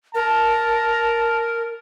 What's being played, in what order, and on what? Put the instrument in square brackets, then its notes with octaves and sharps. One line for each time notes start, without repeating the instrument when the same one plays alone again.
[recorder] A#4 [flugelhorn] A5